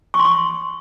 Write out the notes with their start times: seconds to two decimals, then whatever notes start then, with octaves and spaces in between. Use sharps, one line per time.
0.14 C#6
0.19 C6
0.25 C#6